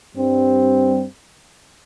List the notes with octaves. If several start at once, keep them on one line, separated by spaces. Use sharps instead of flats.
G2 G3 C4